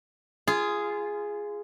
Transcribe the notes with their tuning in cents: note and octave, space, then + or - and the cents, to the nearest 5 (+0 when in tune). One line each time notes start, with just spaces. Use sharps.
F4 -20 G#4 +0